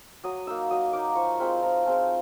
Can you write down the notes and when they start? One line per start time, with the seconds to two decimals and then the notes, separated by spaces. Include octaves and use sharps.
0.24 F#3 D#6
0.47 A#3 D#4 E6
0.71 F#3 D#6
0.92 A#3 D#4 D6
1.15 F3 C#6
1.40 G#3 C4 F4 B5
1.62 F3 A#5
1.85 G#3 C4 F4 A5